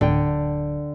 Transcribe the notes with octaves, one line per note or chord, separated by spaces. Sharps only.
D1 D3 G5